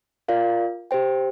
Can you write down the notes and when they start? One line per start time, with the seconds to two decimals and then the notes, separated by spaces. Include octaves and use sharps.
0.28 F4 A#4 D5 F5
0.91 G4 C5 G5